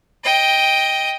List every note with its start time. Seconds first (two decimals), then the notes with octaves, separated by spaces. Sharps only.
0.24 D#5 G5